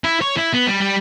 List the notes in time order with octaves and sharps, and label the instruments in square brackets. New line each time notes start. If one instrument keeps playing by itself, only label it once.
[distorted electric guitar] E4
C#5
E4
B3
G3
G3